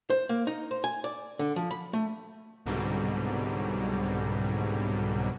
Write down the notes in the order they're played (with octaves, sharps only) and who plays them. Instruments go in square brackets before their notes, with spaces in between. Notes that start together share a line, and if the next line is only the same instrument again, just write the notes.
[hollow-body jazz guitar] C5
A#3
D#4
C5
G#5
D5
D3
F3
B5
A3
[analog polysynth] C2 G#2 B2 D3 F#3 G3